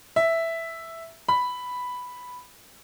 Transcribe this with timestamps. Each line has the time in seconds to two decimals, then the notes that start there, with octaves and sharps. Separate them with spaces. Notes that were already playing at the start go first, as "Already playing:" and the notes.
0.16 E5
1.29 B5